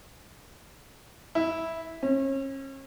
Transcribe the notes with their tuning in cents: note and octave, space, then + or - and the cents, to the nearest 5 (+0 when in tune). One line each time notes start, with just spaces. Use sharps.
E4 -10
C#4 -35